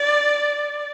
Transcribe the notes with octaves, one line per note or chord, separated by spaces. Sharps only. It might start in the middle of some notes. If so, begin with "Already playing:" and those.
Already playing: D5